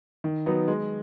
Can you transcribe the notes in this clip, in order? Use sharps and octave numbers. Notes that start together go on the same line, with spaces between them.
D#3
F#3 B3 D#4
G#3